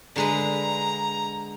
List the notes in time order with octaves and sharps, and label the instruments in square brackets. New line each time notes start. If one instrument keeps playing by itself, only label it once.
[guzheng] D3 G#3 B4 [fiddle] A#5